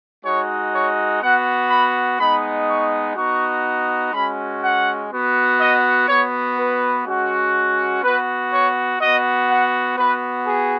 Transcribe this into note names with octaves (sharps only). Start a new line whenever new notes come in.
G#3 D#4 F#4 C#5
C#5
B3 F#4 F#5
B5
G#3 B3 D#4 B5
C#6
B3 D#4 F#4 C#6
G#3 C#4 F#4 B5
F#5
B3 F#4
D#5
B3 F#4 C#5
B4
G#3 C#4 F#4
B3 F#4 B4
C#5
B3 F#4 D#5
F#5
B3 F#4 B4
G#4